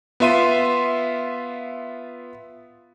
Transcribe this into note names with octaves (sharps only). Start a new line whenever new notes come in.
B3 F4 E5 C6 D#7